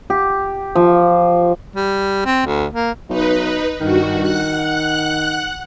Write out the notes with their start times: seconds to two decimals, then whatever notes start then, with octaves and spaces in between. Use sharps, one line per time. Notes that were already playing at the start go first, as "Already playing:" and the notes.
0.10 G4
0.75 F3
1.76 G3
2.26 C4
2.46 D2
2.73 A#3
3.10 B1 D#4 B4
3.80 G2 D#3 F#4
4.21 F#5 F#6